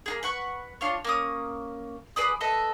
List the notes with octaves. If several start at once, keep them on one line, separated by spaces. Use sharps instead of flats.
A#3 D4 G#4
B4 F#5 C#6
D4 F4 C#5
A#3 C#4 D#6
G#4 B4 D5 D#6
A4 B4 D#5 E5